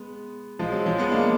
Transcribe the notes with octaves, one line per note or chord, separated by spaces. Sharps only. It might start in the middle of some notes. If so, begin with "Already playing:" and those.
Already playing: G#3 B3
F3 G#3
F#3
F3 G#3
G#3 B3
A#3 D4